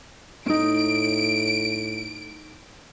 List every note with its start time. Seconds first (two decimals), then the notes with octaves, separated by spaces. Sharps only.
0.46 A2 C#4 D#4 D7